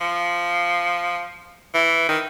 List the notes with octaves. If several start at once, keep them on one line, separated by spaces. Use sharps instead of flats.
F3
E3
D#3